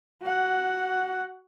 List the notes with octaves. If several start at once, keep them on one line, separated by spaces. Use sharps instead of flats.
F#4 F#5